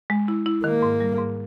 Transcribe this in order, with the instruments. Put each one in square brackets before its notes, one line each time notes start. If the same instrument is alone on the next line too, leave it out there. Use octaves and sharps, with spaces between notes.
[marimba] G#3
E4
E4
[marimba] D#3 [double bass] A#3
[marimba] G#2
G3
G#2